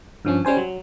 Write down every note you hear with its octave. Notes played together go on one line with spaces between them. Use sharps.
G2 F3 C#4
G3 C#4 C5 G#5
F#3